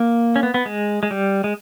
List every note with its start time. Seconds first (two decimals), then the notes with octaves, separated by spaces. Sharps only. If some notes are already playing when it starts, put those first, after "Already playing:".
Already playing: A#3
0.36 C#4
0.43 B3
0.54 B3
0.66 G#3
1.03 G#3
1.11 G3
1.44 G#3